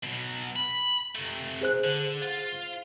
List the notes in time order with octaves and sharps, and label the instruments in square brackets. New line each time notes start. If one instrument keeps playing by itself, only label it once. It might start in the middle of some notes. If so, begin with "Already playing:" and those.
[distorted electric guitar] B2 F#3
B5
C3 A3
[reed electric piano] G#4 C5 F#6
[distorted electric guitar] D3
F4